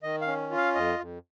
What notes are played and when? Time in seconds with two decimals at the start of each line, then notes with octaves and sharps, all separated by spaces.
0.03 D#3 D#5
0.22 F5
0.27 C#4
0.51 F4
0.57 F5
0.75 F2 D#5
0.99 F2